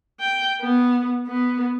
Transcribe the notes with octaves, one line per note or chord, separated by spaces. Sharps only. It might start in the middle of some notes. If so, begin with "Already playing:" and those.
G5
B3
B3